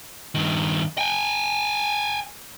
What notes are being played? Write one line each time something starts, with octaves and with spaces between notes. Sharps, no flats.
G2 D#3
G5 G#5